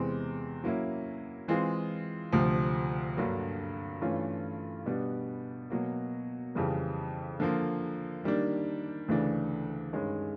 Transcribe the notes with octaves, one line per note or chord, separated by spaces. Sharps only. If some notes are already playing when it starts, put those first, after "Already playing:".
Already playing: E2 C3 E3 G#3 C4
F#3 A#3 C#4 E4
E3 G#3 C4 F4 G#4
D2 C3 F3
G2 D3 F#3 A#3
G2 E3 A3 C#4 F4
B2 G3 B3 D4
B2 F#3 A#3
F2 C#3 E3 G3
D3 F3 A#3
D#3 G3 A#3 D4
D2 C#3 E3 A3 D4
G2 D#3 G#3 C#4